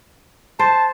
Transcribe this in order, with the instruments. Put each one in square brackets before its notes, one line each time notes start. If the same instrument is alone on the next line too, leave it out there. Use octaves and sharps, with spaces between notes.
[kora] C5 [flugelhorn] A5